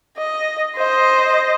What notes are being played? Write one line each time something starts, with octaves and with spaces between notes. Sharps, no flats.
D#5
C5 D#5